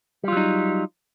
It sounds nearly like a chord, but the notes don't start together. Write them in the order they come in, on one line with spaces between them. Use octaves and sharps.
G3 F4 F#3 D#4